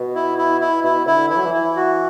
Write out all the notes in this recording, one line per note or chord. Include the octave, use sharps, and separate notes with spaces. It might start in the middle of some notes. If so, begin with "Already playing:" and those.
Already playing: B2
E4
E4
E4
B2 E4
D3 E4
E3 E4
F#3
E3
E4
F#4